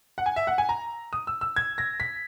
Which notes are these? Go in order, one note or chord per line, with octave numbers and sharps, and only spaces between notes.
F#5
G#5
E5
F#5
G#5
A#5
D#6
E6
E6
G#6
A#6
B6